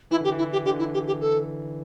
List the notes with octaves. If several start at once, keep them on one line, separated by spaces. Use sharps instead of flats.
E3 E4
D3 G4
E3
E4
G4
D3 G4
E4
G4
G4
A4